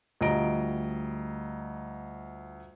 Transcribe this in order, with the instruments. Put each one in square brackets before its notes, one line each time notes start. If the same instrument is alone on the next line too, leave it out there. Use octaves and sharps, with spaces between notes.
[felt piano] D2 G3 F4 D#5 A#5 D7